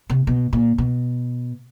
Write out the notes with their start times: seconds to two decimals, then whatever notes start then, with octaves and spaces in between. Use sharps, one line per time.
0.10 C3
0.27 B2
0.53 A#2
0.78 B2